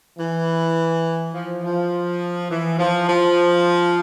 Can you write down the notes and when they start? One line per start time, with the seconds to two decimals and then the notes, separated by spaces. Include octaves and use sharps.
0.18 E3
1.33 F3
1.63 F3
2.51 E3
2.79 F3
3.08 F3